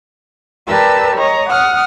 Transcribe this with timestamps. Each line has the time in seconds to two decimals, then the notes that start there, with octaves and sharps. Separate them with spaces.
0.69 G4 A#4 B4 D5 A5 E6
1.17 C#5 D#5 A#5
1.50 F#5 D#6 F6